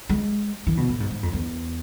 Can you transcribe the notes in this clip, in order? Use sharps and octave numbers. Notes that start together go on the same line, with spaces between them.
G#3
E3
B2
A2
G#2
G#2
F2
E2